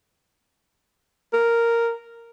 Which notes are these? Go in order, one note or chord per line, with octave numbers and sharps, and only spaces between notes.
A#4